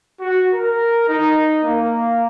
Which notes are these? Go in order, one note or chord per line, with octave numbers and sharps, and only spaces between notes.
F#4
A#4
D#4
A#3